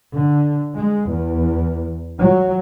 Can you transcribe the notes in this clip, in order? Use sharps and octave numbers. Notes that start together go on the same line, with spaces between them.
D3
G#3
E2
F#3